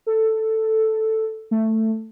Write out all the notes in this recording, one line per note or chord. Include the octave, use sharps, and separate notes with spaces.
A4
A3